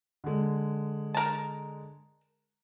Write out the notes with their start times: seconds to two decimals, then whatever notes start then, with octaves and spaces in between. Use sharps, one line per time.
0.24 D3 G#3
1.14 A#4 A5